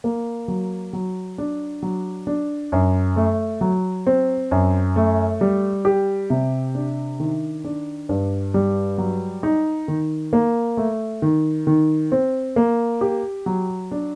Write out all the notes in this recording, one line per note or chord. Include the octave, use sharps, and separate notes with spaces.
A#3
F#3
F#3
D4
F#3
D4
F#2
A3
F#3
C4
F#2
A3
G3
G4
C3
D4
D#3
D4
G2
G3
F#3
D#4
D#3
A#3
A3
D#3
D#3
C4
A#3
G4
F#3
D4